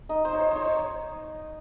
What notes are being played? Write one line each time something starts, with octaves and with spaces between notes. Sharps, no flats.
D#4 D#5
C5
D#4 C#5
C5
D#4 C5 C#5
C#5